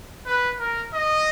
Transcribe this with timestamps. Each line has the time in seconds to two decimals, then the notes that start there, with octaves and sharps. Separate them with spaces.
0.26 B4
0.60 A#4
0.94 D#5